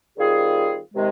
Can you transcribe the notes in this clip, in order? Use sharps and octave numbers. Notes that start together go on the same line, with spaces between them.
D#3 G3 C4 F4 G#4
C3 D#3 G#3